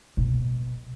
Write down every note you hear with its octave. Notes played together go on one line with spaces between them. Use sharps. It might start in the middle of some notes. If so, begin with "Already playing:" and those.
B2